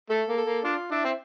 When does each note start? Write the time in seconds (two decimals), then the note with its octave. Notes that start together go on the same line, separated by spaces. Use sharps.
0.10 A3 A4
0.28 A#3
0.37 A4
0.46 A#3
0.64 D4 F4
0.91 D4 E4
1.05 C4